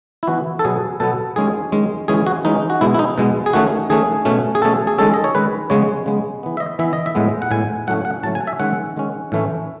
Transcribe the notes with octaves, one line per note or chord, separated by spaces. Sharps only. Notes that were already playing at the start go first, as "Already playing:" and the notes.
E4
E3 B3 F#4
A4
B2 F#3 B3 G#4
B2 F#3 B3 A4
D#3 G#3 C#4 G#4
D#3 G#3 C#4
E3 G#3 C#4 G#4
F#4
E3 G#3 C#4 D#4
F#4
B2 G#3 B3 E4
E4
D#4
B2 G#3 B3
G#4
D#3 A3 C#4 F#4
D#3 A3 C#4 G#4
B2 A3 C#4
G#4
B2 A3 C#4 A4
G#4
D#3 G#3 C#4 A4
D#5
C#5
D#3 G#3 C#4 B4
C#3 G#3 B3 C#5
C#3 G#3 B3
E3 B3
E5
D#5
E3 B3 E5
D#5
E5
A2 G#3 B3
F#5
A2 G#3 B3 G#5
A2 F#3 A3 C#4 F#5
F#5
A2 F#3 A3 C#4 A5
G#5
E5
D#3 G#3 C#4 F#5
D#3 G#3 C#4
A2 E3 A3 C#4